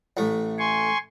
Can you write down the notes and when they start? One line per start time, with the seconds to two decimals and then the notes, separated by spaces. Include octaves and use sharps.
0.17 A1 A3
0.59 G#5 C6 C#6